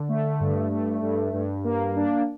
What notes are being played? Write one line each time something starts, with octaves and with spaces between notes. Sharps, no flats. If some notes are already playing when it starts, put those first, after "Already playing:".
Already playing: D3
A3
G2
A3
G2
G2
A#3
D4